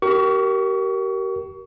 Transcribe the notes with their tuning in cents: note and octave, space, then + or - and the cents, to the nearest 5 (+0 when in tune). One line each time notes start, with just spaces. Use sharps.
G4 -35 A#4 +0 C#6 +30